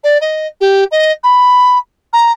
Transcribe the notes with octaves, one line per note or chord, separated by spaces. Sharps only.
D5
D#5
G4
D#5
B5
A#5